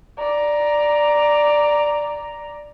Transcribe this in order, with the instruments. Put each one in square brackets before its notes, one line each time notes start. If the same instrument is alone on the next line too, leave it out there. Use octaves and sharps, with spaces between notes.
[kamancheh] D5 A#5